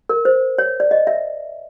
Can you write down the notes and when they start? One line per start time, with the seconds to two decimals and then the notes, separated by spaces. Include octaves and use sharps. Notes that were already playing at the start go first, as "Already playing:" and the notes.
0.09 A#4
0.25 C5
0.58 C#5
0.80 D5
0.91 D#5
1.07 E5